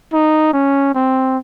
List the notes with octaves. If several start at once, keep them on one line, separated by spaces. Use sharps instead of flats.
D#4
C#4
C4